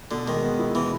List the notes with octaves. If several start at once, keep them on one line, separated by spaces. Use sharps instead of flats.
B2 D3
D#3 G#3
B3
E4
B2 E3